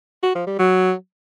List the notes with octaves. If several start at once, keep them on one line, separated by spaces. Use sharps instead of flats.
F#4
F3
G3
F#3